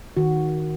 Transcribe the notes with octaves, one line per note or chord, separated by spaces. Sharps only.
D#3 F#4